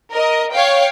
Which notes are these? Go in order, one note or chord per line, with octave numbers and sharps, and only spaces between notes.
A#4 D#5
C#5 F5 G5